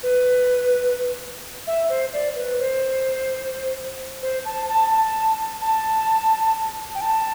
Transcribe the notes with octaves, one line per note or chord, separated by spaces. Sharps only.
B4
E5
C5
D5
B4
C5
C5
A5
A5
A5
A5
G5
A5